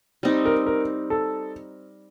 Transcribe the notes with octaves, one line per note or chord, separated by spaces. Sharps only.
G3 C4 D#4
A#4
A#4
A4